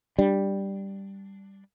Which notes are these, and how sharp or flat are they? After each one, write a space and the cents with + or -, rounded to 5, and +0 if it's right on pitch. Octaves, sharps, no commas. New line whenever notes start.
G3 +0 D4 +0